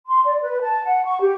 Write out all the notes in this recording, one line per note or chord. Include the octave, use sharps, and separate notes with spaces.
C6
D5
B4
A5
F#5
C#6
G4